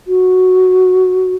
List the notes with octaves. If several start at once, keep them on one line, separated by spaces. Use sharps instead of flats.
F#4